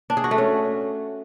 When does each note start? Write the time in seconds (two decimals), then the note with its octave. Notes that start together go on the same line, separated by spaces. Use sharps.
0.10 D4
0.17 G#4
0.24 F#4
0.31 A3
0.38 C#4